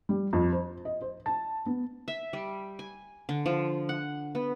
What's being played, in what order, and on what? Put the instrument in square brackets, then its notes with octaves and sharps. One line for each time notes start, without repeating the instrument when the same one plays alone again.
[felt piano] G3
F2
C5
D#5
C5
A5
B3
[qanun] E5
G3
G#5
D3
F3
F#5
B3